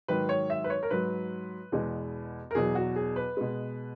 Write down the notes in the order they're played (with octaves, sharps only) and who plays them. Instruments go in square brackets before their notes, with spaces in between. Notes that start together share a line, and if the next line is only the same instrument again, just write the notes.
[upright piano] G#2 D#3 F#3 B4
C#5
E5
B4
C#5
A#4
G#2 F#3 B4
E2 B2 G#3
A#4
E2 B2 F#3 G#4
F#4
G#4
B4
B2 G#3